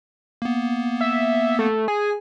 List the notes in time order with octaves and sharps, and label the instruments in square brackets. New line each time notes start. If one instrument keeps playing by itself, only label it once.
[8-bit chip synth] A#3 B3
[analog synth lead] E5
A3
[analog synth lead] G#4 [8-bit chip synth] G#5